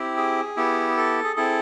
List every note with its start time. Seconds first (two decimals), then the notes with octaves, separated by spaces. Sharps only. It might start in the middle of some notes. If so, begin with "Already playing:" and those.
Already playing: C4 E4 G4
0.17 G#4
0.57 B3 E4 G4
0.97 A4
1.24 G#4
1.36 C4 E4 G#4 A4